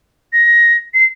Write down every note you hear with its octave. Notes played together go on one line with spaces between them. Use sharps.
A#6
C7